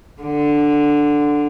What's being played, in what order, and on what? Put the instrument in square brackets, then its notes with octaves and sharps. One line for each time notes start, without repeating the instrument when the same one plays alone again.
[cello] D3